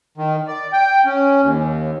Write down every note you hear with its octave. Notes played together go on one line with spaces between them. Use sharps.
D#3
D5
G5
C#4
D#2